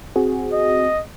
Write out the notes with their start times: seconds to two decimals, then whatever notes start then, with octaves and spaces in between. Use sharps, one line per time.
0.16 C4 F#4 G#4
0.53 D#5